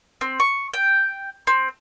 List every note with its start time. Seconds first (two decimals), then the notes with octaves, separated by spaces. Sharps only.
0.21 C4
0.40 C#6
0.74 G5
1.47 C4